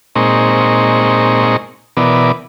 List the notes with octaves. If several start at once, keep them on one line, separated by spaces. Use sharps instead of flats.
A#2 G#3 C4 D#4 A#5 C#6
B2 E3 B3 A#4 D5